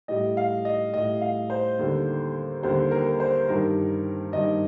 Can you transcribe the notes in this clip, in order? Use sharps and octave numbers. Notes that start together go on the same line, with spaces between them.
A2 G3 D#5
F5
D#5
A2 G3 D#5
F5
C5
D#2 D3 G3
D#2 D3 G3 C5
A#4
C5
G2 D#3 G3 A#4
G2 D#3 G3 D#5